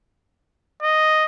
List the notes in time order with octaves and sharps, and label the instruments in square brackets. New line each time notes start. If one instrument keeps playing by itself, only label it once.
[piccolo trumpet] D#5